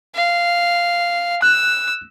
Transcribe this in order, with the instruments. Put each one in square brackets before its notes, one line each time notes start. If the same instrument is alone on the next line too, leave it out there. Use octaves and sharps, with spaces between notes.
[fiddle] F5
[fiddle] E6 [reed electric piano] F#6